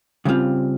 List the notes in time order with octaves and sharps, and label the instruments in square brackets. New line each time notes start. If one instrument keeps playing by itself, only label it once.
[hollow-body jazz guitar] C#3 G3 C4 F4